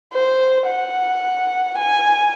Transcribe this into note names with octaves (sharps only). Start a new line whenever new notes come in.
C5
F#5
G#5